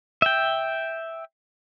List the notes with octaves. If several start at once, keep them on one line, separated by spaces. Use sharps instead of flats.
E5 G5